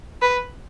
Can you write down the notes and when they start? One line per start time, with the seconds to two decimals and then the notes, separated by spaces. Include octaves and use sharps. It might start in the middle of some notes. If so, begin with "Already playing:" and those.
0.22 B4